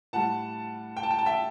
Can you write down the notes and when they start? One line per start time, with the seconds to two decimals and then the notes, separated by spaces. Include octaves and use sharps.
0.13 A2 G3 F#5 A5
0.96 G5
1.03 A5
1.11 G5
1.18 A5
1.26 E5 G5